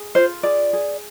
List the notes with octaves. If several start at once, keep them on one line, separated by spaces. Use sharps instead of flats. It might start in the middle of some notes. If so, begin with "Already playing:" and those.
Already playing: G#4
F4 C5
G#4 D5
G#4